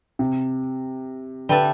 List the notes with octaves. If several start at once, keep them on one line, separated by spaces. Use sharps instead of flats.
C3
D3 G4 B4 E5 A5